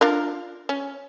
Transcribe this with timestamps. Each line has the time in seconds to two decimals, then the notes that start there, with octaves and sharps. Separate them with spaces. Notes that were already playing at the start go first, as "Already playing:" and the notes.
0.01 D4 F4 A#4
0.69 C#4